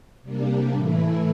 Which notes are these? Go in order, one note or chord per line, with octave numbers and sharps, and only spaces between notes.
C3 G3 A#3 D4
A2 E3 A3 E4